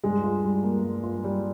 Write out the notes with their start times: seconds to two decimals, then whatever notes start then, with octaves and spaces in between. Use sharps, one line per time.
0.04 G2 G#3
0.24 F4
0.44 G3
0.63 A#3
0.84 G2
1.03 F4
1.24 G3